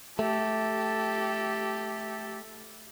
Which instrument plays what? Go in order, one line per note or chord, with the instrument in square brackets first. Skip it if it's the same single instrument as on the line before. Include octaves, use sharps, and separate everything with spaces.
[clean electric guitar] A3 [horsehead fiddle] G4 A4